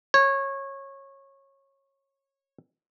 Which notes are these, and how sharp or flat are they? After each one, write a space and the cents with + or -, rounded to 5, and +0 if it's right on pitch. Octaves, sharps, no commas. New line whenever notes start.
C#5 -20